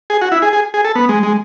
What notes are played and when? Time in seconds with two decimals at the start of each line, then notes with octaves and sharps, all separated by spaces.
0.10 G#4
0.21 F#4
0.32 E4
0.42 G#4
0.53 G#4
0.74 G#4
0.85 A4
0.95 B3
1.09 G#3
1.23 G#3